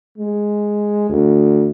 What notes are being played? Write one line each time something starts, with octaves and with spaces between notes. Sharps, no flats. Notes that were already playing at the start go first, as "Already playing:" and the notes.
G#3
D2